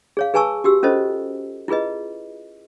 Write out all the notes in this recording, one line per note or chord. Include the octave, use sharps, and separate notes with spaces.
G#4 C#5 F5
G#4 B4 G#5 A5 C#6 E6
F#4 G4 E6
C#4 F4 A4 C5 D#5
E4 F4 G#4 B4 D#5